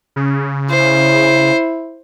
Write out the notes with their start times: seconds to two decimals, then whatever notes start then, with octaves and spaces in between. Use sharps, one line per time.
0.16 C#3
0.70 E4 C5